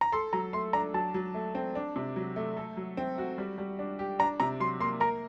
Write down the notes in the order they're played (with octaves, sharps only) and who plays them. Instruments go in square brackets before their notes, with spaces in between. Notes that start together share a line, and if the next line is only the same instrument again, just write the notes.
[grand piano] A#5
[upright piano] A4 [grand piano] C6
[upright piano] F#3 [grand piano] A#5
[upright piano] A3 [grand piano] C6
[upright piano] D4 [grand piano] A#5
[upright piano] F#3 [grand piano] A5
[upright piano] F#3
A3
C4
D4
C3
F#3
A3
A4
F#3
C4
F#4
G3
G3
D4
G4
[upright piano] D4 [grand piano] A#5
[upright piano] C3 [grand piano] A#5
[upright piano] F#3 [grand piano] C6
[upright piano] A#3 [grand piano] C6
[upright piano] A#4 [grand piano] A#5